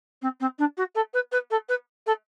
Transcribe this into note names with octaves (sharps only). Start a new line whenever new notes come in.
C4
C4
D4
F#4
A4
B4
B4
A4
B4
A4